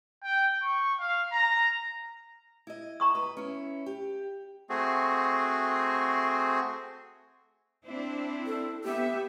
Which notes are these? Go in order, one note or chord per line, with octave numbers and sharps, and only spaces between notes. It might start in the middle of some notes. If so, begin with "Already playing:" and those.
G5
C#6
F5
A#5
E4 D#5
A#5 C#6 D#6
B4
C#4 E4
G4
A3 C4 F#4 G#4
C4 D4 E4
A4
B3 G4 E5